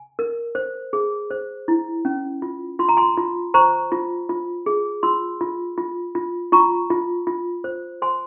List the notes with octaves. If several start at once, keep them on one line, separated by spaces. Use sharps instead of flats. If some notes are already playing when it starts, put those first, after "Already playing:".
Already playing: G#5
A#4
C5
G#4
C5
E4
C#4
F4
F4 C6
A#5
G#5 C6
F4
C5 A#5 C#6
F4
F4
G#4
F4 C6 E6
F4
F4
F4
F4 A#5 C#6
F4
F4
C5
C5 G#5 C6